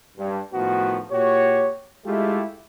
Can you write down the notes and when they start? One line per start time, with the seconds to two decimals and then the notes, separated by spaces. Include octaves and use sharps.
0.18 G2
0.52 A2 D#3 F3 B3 F#4
1.10 A#2 F#4 G4 C#5
2.05 G#3 A3 E4 F4 G4